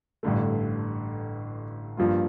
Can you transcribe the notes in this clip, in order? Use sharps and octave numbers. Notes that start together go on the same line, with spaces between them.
A1 G2 D3 A3
G2 F3 A#3 F4